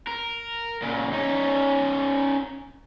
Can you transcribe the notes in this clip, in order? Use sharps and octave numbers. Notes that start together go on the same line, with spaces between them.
A#4
A#2 C#3
C#4 D#4